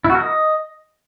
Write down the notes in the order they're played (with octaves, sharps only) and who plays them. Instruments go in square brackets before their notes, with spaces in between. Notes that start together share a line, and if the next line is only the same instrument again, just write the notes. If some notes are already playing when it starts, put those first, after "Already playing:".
[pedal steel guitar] E4
F#4
A#4
D#5